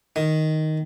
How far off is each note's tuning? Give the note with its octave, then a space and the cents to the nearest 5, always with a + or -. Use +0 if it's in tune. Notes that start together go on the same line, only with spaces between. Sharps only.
D#3 +0